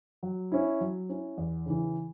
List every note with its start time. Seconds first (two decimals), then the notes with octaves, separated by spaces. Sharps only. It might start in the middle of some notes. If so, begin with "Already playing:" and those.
0.23 F#3
0.52 C#4 E4
0.81 F#3
1.09 C#4 E4
1.37 E2
1.66 C#3 E3